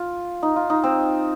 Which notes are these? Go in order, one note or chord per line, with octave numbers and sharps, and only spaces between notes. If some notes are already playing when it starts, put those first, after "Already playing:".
Already playing: F4
D#4
F4
D#4
C4